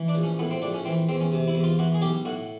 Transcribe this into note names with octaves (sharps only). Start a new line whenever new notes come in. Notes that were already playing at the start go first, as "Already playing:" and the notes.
Already playing: E3
D4
A#1
C#4
A2 B3
C4
A#1 D4
C#4
E3 C4
E2 C4
C#4
C3
E4
E2
F4
E3 F#4
G#4
B1 G4
A2 F#4